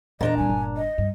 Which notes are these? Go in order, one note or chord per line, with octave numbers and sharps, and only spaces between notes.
E2 A#2 D4 D#5 A#5
G3 C4 G#5
G1
D#5
G2